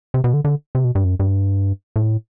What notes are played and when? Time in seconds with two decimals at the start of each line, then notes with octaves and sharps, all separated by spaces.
0.14 C3
0.24 B2
0.34 D3
0.45 D3
0.75 C3
0.84 B2
0.95 G2
1.04 F#2
1.20 G2
1.96 A2